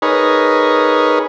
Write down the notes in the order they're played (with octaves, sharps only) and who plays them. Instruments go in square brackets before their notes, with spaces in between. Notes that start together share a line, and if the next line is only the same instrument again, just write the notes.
[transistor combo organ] D#4 G#4 A#4 B4 C#5